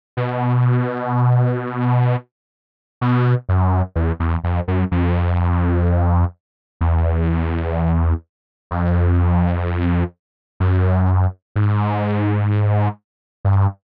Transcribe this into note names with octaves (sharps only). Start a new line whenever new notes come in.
B2
B2
F#2
E2
E2
F2
F#2
F2
E2
F2
F#2
G#2
G2